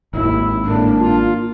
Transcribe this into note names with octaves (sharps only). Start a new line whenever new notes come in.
G#1 D#2 E4
A2 A#3 D4
F4